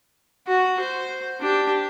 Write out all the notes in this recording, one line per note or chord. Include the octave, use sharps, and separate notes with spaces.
F#4
C5
D4 G4